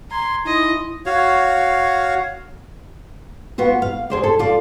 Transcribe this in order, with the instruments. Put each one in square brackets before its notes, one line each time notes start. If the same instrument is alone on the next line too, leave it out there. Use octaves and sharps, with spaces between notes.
[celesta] A#5 G#6 [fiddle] C6
[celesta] D#4 C6 [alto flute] E4 [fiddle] D#5
[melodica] F#4 C#5 F5
[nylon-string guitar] B3 F4 F#4
F5
G#4 C5 D5
A4
F4 D5